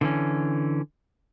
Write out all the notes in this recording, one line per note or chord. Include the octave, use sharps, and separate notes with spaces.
D3 E3 C#4